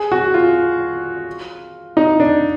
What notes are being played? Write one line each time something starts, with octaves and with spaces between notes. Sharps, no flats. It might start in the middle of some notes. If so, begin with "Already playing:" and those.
Already playing: G#4
F#4
F4
D#4
D4